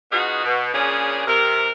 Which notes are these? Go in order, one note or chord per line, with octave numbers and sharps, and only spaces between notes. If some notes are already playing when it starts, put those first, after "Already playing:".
F#3 B3 D#4 F4 F#4 G#4
B2
A#2 C#3 C#4 D4 G#4
C3 A#4